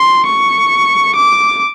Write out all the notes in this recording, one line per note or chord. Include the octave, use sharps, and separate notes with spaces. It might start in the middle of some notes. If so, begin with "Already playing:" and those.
Already playing: C6
C#6
D6